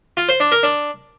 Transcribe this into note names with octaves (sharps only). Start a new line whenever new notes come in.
F4
C5
D4
A#4
D4